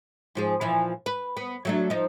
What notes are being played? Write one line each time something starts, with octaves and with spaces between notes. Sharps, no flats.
G#2 F3 G#4
A#2 E3 F3
B4
B3
F#3 A3 D4
F3 D#4